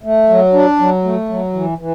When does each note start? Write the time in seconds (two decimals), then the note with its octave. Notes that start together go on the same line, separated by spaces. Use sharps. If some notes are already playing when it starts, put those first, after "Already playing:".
0.04 A3
0.29 F#3
0.53 D4
0.79 F#3
1.04 A3
1.29 F#3
1.53 E3
1.78 E3